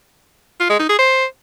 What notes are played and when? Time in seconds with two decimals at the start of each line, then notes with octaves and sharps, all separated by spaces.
0.60 F4
0.70 G#3
0.79 D#4
0.89 G#4
0.99 C5